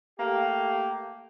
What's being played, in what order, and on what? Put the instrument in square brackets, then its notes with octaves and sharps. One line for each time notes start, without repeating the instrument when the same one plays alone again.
[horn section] A3 A#3 G4